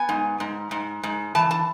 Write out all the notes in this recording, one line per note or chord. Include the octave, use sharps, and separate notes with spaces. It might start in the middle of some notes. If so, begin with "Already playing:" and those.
Already playing: B3 G#5
G#2
G#2
G#2
G#2
E3 A5
A5